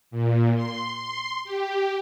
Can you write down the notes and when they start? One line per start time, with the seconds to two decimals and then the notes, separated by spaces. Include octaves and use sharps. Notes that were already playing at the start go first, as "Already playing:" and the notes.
0.11 A#2
0.55 C6
0.96 C6
1.44 G4